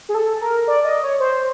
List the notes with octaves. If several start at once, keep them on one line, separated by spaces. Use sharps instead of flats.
G#4
A4
A#4
D5
D#5
C#5
C5